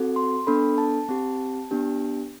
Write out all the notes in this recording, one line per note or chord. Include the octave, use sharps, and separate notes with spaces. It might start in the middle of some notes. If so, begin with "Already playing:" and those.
Already playing: C4 F#4 A4
C6
B3 D4 A4 B5
A5
C4 G4
B3 D4 G4